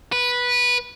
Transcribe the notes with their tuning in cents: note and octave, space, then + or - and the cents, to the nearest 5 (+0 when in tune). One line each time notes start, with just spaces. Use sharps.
B4 -10